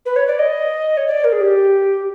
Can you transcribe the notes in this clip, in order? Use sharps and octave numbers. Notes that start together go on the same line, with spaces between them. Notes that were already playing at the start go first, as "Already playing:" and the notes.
B4
C#5
D5
D#5
C#5
D5
A#4
G#4
G4